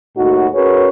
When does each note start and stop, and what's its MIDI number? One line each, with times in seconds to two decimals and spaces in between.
0.17 0.47 39
0.17 0.47 45
0.17 0.47 63
0.17 0.47 66
0.54 0.89 61
0.54 0.89 66
0.54 0.89 68
0.54 0.89 70
0.54 0.89 71
0.54 0.89 73